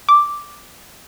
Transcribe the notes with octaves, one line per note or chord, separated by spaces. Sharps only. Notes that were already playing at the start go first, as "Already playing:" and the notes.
D6